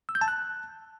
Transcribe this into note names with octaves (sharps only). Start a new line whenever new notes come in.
E6
G6
A5
F#6